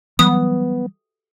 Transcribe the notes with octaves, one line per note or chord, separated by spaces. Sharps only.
E3 F#3 G3 B3 D#6